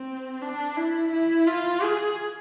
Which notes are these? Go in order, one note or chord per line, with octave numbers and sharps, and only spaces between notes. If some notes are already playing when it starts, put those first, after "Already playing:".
Already playing: C4
D4
E4
E4
F4
G#4